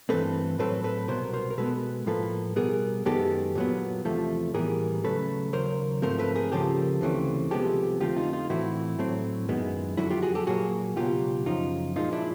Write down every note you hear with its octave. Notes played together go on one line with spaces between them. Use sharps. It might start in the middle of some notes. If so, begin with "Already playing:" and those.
G2 E3 A3 C4 A4 B4
A2 F#3 A3 C4 A4 B4
A4 B4
C2 B2 F#3 B3 A#4 C5
A#4 C5
A#4
B2 G#3 B3 A4 B4
A2 F3 A#3 A4 B4
B2 G3 B3 G#4 A#4
F#2 D#3 G#3 B3 G4 A4
A#2 F#3 B3
E2 C3 F3 A3
A2 E3 G3 B3 G#4 A#4
D#2 C#3 F#3 A3 A4 B4
D#2 C#3 F#3 A#4 C5
G#2 F3 A3 C4 A#4 C5
A4 B4
G#4 A#4
C#2 C#3 F3 A#3 G4 A4
D2 C#3 E3 A3 C4
C2 C3 F3 G#3 B3 G4 A4
F2 D3 F3 A3 C4 F4 G4
D#4 F4
D#4 F4
A2 E3 A3 C4 E4 F#4
A2 F#3 A3 C4
F#2 D#3 G#3 B3
F2 D3 F#3 E4 F#4
F4 G4
F#4 G#4
G4 A4
A#2 F#3 A#3 F#4 G#4
C#2 B2 F#3 F4 G4
F#2 C#3 F3 D#4 F4
A#2 F3 G#3 D#4 F4
D4 E4